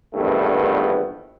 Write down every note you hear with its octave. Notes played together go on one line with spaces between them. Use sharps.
A#1 E2 G2 D#3 A3 B3